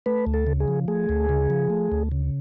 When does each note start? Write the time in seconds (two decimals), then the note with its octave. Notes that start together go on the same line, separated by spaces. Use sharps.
0.06 A3 B4
0.27 D2
0.34 A4
0.47 C#3
0.60 G#4
0.68 F3
0.88 A3 G#4
1.09 D2
1.29 C#3
1.50 F3
1.70 A3
1.92 D2
2.12 C#3